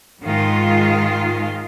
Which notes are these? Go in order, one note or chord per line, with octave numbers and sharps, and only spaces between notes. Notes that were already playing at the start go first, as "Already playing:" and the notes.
G#2 D#3 G#3 F4